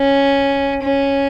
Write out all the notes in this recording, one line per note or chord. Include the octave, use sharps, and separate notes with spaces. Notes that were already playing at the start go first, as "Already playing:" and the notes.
Already playing: C#4
C#4